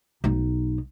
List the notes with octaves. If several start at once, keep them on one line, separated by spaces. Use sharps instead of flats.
B1 D#4